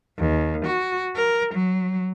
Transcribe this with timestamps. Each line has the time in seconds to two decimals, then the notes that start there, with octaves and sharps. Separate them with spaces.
0.18 D#2
0.65 F#4
1.15 A#4
1.54 F#3